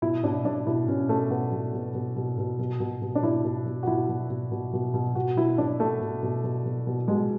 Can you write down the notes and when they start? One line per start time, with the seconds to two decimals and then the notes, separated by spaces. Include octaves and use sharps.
0.02 B2 E4
0.24 B2 D4
0.45 B2 D4
0.67 B2 E4
0.88 B2 C#4
1.09 B2 A3
1.31 B2 B3
1.52 B2
1.74 B2
1.95 B2
2.16 B2
2.38 B2
2.59 B2
2.80 B2
3.02 B2
3.15 D4
3.23 B2 E4
3.45 B2
3.66 B2
3.83 F#4
3.87 B2 E4
4.09 B2
4.30 B2
4.52 B2
4.73 B2
4.94 B2
5.15 B2 F#4
5.37 B2 E4
5.58 B2 D4
5.79 B2 A3
6.01 B2
6.23 B2
6.44 B2
6.66 B2
6.87 B2
7.08 B2 G#3